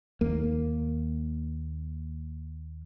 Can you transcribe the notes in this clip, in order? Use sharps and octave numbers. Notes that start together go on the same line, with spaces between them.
D#2 A#3